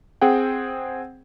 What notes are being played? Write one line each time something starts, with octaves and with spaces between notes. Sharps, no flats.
C4 G#4 F#5 G5